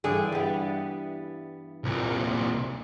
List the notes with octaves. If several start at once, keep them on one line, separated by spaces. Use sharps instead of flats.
G2 D3 E3 G#4
G3 B3
C2 A#2